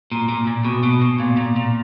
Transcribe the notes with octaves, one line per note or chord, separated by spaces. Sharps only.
A#2
A#2
A#2
B2
B2
B2
A#2
A#2
A#2